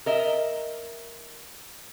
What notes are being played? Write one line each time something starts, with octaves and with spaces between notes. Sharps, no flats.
A#4 D#5 E5